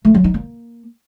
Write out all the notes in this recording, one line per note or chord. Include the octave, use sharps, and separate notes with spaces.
A3
F#3
D#4
A#3